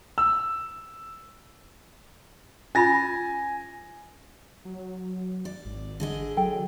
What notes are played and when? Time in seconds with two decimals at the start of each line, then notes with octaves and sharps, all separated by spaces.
0.18 E6
2.75 C#4 F4 G#5 B5 A6 A#6
4.65 F#3
5.45 D5
5.65 G#1
6.00 D3 G#4 D#5
6.37 F#3 A4 G5